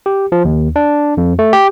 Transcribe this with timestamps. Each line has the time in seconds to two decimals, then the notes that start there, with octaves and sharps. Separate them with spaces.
0.06 G4
0.32 F3
0.45 D#2
0.76 D4
1.17 F2
1.39 A3
1.53 G4